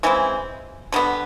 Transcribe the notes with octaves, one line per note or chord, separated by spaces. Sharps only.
C#3 E3 G#3 C4
D3 G3 B3